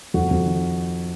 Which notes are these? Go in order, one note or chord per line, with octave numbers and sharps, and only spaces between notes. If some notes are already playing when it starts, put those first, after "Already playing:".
F2 F#4
F2
D#3